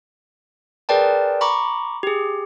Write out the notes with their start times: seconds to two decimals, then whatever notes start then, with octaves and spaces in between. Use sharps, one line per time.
0.89 G#4 A#4 B4 D5 G5 A5
1.41 A#5 B5 C#6 D6
2.03 G4 G#4